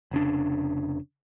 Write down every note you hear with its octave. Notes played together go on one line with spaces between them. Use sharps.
F1 C#3 D4